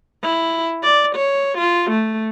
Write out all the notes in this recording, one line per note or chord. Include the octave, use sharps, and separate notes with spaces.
E4
D5
C#5
F4
A3